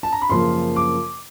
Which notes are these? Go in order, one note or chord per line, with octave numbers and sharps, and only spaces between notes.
A5
A#5
B5
F#2 C#3 F3 A#3 C6
D6